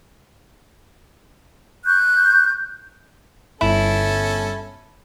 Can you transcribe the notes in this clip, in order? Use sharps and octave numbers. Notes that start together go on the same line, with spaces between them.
C#6 F#6 G6
G1 C#4 E4 A4